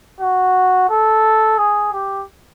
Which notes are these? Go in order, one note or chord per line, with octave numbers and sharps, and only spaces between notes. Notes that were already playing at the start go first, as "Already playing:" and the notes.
F#4
A4
G#4
G4